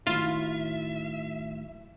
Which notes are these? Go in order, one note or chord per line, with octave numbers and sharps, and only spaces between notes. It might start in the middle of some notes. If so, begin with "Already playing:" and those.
A2 D#3 F#3 E4 F4 E5